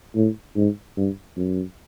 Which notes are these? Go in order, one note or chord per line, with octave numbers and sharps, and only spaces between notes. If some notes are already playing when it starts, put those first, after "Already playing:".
A2
G#2
G2
F#2